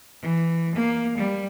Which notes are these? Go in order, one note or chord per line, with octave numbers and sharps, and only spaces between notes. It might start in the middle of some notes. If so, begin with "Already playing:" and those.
E3
A#3
G3